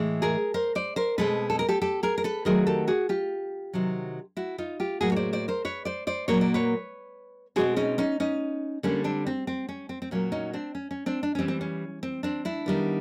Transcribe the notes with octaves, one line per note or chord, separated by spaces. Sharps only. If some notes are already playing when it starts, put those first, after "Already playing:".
Already playing: A2 E3 G#3
G#4 A#4
A#4 C5
C5 D5
A#4 C5
B2 G#3 C4 A4 B4
A4
A#4
G4 A4
G4 A4
G#4 A#4
A#4
A4 B4
D#3 F#3 A3 C4 G#4 A#4
G4 A4
F#4 G#4
F4 G4
C3 D#3 F#3
E4 F#4
D#4 F4
F4 G4
A2 F#3 A#3 F#4 G#4
C#5
C5 D5
C5 D5
A#4 C5
B4 C#5
C5 D5
C5 D5
A#2 F#3 A#3 C#5
D5
B4 C#5
B2 G#3 C4 F#4 G#4
C#4 D#4
C#4 D#4
C#4 D#4
D3 G3 A#3 C#4
C4 D4
C4
C4
C#4
C4
C4
A#2 F#3 A#3 C#4
C#4 D#4
C4 D4
C#4
C#4
C4 D4
D4
E3 G3 C4 C#4
C4
C#4
C4
C4 D4
D4 E4
D#3 G3 B3